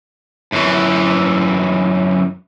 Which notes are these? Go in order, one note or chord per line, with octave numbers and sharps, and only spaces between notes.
F#2 E3